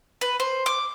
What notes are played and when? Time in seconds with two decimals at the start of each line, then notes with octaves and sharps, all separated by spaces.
0.21 B4
0.40 C5
0.66 D6